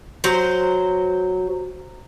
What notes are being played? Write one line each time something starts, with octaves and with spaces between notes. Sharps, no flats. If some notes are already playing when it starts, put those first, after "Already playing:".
F#3 C5